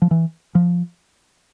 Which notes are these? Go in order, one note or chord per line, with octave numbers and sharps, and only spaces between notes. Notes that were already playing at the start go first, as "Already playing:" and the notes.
F3
E3
F3